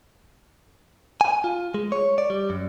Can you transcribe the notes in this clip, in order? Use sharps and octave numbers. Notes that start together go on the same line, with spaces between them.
G#5
F4
G#3
C#5
D5
G3
F#2